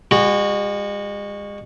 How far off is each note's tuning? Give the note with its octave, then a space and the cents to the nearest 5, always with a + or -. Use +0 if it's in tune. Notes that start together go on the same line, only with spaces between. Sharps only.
G#3 -40 F#4 -5